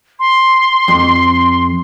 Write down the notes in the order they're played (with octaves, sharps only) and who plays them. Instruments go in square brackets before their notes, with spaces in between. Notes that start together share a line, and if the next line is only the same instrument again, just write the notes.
[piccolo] C6
[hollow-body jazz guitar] F2